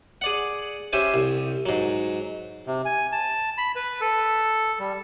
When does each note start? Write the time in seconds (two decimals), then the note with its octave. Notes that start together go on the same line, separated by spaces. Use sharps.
0.21 G#4 D5 F#5
0.93 C#4 G4 C5 E5 G#5
1.14 C2
1.66 G#2 F#3
2.67 C3
2.85 G#5
3.12 A5
3.58 B5
3.76 B4
4.01 A4
4.80 G3